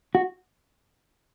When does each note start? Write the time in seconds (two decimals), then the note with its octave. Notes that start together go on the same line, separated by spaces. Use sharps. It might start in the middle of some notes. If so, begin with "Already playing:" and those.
0.15 F#4